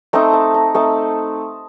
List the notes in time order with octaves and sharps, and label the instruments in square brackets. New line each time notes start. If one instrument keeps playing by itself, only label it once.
[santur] A3 C4 D#4 A#5
A5
A#5
A3 C4 D#4 A5